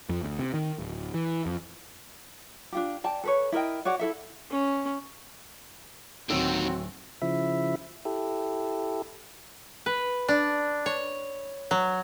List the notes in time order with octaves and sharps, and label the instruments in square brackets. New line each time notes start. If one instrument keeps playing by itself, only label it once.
[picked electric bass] F2
D2
C3
D#3
D1
E3
F2
[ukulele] D4 F4 G4
D5 G5 A5
A4 B4 C#5
E4 A#4 D#5 G5
F#4 C#5 D5 F#5
E4 A4 E5
[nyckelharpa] C#4
[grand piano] D1 F#3 E6 [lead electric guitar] D#2 D#3 [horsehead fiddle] C4 F#4
[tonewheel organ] C#3 F3 E4 E5
E4 G4 A4
[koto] B4
D4
C#5
F#3